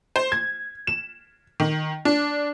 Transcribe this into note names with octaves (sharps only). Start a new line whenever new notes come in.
C5
G#6
E7
D#3
D4